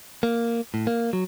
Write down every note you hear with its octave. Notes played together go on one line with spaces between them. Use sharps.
A#3
A2
A#3
F#3